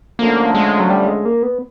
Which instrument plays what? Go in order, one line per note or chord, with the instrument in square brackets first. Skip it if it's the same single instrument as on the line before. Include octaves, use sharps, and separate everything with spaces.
[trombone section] D3 F3 A3 C#4 [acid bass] A#3
[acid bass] G#3
F#3
G3
G#3
A#3
B3